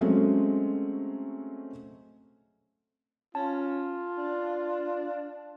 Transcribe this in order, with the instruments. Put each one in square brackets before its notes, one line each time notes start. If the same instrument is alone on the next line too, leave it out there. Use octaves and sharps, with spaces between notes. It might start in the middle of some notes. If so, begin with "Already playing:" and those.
[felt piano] F#3 G#3 A3 C4 C#4
[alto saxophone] C#4 [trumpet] F4 [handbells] A5
[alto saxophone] D4